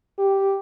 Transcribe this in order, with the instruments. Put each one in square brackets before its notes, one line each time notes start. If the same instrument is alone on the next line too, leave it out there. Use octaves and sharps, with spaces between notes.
[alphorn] G4